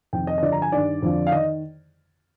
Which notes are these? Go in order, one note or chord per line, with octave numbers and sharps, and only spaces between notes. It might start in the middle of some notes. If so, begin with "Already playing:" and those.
F2 C3 D#3 G5
D#5
D#5
G2 D3 F3 D5
A#5
G#5
G2 D#3 D5
F2 D3 F3
F5
D#3 D#5